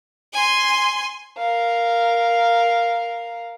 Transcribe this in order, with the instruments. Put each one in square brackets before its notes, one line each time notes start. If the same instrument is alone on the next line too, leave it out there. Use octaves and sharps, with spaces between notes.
[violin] G#5 C6
A#4 F5